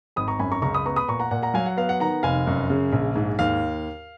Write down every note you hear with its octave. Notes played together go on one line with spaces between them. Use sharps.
G#1 B5 D#6
A#5 C#6
F#2 G#5 B5
A#5 C#6
C#2 A#5 C#6
B5 D#6
B3 A#5 C#6
B5 D#6
A#2 A#5 C#6
F#5 A#5
A#2 F#5
F#5 A#5
F#3 F5 G#5
F#5
B3 F5
F#5
D#3 F#5 A#5
F1 F5 G#5
F#2
C#3
A#1
G#2
D#2 F5